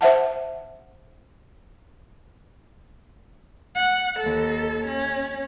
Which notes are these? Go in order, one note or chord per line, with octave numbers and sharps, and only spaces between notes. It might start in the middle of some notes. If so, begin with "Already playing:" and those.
C5 E5 F#5 A5
F#5
D#2 A4
C#4